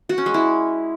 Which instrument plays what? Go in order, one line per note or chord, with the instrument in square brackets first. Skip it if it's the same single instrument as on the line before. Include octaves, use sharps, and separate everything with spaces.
[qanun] F#4
C#4
G#3
E4